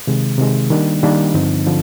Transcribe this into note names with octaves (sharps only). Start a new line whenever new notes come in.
C3 D#3 G#3
C3 D#3 G#3
D#3 G3 A#3 D4
D#3 G3 A#3 D4
G2 D3 F3 C4 D#4
D3 F3